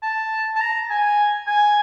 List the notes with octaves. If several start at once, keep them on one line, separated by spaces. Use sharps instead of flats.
A5
A5
A#5
G#5
G#5